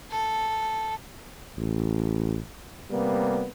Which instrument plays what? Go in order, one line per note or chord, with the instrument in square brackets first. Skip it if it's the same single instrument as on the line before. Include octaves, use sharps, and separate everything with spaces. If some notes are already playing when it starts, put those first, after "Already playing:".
[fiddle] A4
[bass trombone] A1
[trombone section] C3 G3 A#3 B3